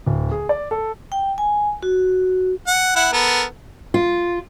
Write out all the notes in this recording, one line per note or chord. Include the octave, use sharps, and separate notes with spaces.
D1
G#4
D5
A4
G5
G#5
F#4
F#5
E4 F#5
B3 A4 A#4
F4